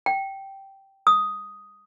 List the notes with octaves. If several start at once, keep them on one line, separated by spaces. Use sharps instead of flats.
G5
D#6